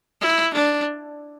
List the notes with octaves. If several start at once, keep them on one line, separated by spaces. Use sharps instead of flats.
E4
D4